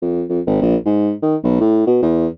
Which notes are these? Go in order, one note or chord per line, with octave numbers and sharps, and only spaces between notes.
F2
F2
G#1
A#1
G#2
D#3
B1
A2
B2
E2